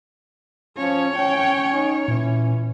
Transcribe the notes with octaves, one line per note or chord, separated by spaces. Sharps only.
F3 C#4 C#5
C#4 G5
D#4
A#2 E3 C#4